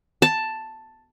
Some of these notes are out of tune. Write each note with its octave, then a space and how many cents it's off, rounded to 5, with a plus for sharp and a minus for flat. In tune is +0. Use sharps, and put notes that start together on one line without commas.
A5 +5